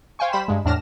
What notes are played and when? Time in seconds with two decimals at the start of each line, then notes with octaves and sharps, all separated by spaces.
0.19 C5 F5 G5 G#5 C#6
0.32 G3 C5 B5 B6 E7
0.48 G2 G#3
0.65 E2 A2 D4 F6 A#6 E7